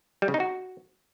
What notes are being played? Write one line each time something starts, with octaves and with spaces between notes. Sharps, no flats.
G3
C#3
D#4
F#4